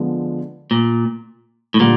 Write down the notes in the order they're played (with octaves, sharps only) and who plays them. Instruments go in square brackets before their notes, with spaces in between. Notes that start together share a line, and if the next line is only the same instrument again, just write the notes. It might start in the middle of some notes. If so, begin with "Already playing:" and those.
Already playing: [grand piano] D3 F3 G#3 B3
[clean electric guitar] A#2
A2
[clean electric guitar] A#2 [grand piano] D3 G3